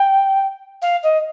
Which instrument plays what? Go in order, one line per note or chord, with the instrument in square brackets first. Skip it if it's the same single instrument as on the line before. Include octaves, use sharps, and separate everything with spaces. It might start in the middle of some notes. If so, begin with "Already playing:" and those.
Already playing: [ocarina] G5
F5
D#5